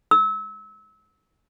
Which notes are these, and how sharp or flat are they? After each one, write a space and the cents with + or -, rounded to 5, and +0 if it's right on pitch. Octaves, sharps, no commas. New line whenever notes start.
E6 -30